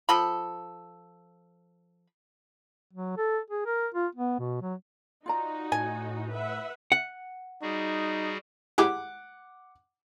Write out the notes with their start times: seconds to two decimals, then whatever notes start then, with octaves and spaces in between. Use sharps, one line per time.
0.09 F3 A4 B5
2.93 F#3
3.17 A4
3.50 G#4
3.66 A#4
3.94 F4
4.15 B3
4.39 B2
4.62 F#3
5.26 D#4 F4 F#4 D5 A#5
5.72 A2 G#5
6.32 B4 E5 F#5
6.92 F#5
7.62 G3 D#4 F#4 G#4
8.78 E4 G4 G#4 F#5 D6